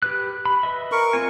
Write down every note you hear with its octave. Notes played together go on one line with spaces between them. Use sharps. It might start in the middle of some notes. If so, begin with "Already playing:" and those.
G4 B4 F#6
B5
B4 D#5 E5
A#4 C#6
C4 F4 G#5